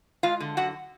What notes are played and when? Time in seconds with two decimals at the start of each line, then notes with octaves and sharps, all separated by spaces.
0.23 G#3 F4 F5
0.40 D3
0.57 F#2 F#4 F#5